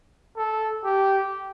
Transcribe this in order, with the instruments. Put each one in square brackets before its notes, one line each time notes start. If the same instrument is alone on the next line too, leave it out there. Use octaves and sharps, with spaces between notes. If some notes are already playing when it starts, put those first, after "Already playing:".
[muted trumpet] A4
G4